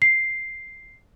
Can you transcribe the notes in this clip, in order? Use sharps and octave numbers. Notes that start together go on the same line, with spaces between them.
C7